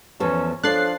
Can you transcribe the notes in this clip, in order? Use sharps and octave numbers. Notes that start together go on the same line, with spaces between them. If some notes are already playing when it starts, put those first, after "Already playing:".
E2 F3 C#4 A4
F3 D4 A4 C#5 F#6 A6 C7